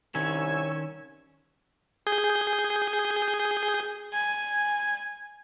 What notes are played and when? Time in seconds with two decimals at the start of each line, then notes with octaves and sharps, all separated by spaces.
0.15 C2 D#3 C#4 C#5 G#5 E6 G#6
2.07 G#4 G6
4.13 G#5